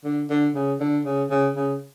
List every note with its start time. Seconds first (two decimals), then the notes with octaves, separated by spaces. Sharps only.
0.04 D3
0.30 D3
0.55 C#3
0.80 D3
1.05 C#3
1.30 C#3
1.56 C#3